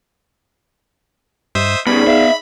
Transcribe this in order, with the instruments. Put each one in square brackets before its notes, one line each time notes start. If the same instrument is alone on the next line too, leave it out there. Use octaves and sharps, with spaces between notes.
[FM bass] G2 [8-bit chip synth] C5 E5 D#6 [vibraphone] D#5
[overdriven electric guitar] G2 C#3 [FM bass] B3 [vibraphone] D#4 G#4 D5 [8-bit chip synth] B5
[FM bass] B3 [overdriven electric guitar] E5 F5